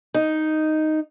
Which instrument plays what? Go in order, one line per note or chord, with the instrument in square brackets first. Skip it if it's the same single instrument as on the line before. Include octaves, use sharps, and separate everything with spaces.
[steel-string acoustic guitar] D#4